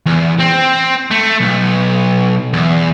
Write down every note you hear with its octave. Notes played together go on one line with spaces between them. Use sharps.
E2
C4
A3
B1
E2